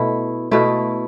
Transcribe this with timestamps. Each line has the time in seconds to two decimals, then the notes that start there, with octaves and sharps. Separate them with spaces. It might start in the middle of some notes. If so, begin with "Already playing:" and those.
Already playing: B2 A3 E4
0.51 B2 A3 E4